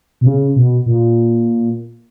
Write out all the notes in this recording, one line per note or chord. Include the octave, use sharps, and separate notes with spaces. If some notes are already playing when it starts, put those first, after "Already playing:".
B2
C#3
B2
A#2